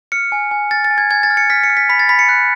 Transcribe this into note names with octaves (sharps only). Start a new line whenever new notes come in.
F6 C#7
G#5
G#5
F6 A6
A6
G#5
G#6
G#5 G#6
A6
F6
C#7
F6 B6
C#7
F6
B6
B5 B6
A6
B5 B6
C#7
F#6